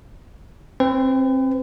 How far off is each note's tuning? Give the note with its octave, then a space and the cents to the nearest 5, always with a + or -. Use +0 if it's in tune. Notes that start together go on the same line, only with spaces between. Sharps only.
C4 +20 B4 +40